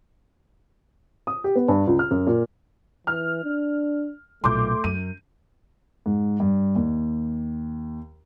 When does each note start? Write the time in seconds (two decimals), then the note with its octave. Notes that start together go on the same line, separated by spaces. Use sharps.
1.27 D#6
1.44 G4
1.55 B3
1.68 G2
1.87 C#2
1.99 F6
2.11 F#2
2.27 A#2
3.07 E3 F6
3.44 D4
4.44 B1 A#2 A3 C6 D6 G6
4.84 F#2 D#7
6.06 G#2
6.40 G2
6.75 D#2